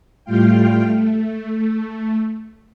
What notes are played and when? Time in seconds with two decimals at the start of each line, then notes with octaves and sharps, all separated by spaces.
0.24 A2 G3 A3 F4 F5 G5
0.85 A3